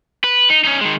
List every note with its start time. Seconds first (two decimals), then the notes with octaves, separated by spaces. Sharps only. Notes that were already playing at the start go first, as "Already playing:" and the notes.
0.24 B4
0.50 D#4
0.64 C#4 D#4
0.81 D#3 G#3